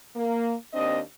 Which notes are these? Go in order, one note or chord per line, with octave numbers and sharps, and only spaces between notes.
A#3
D#2 C4 D4 D#5